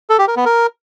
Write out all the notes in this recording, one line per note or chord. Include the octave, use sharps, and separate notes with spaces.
A4
G4
A#4
B3
A#4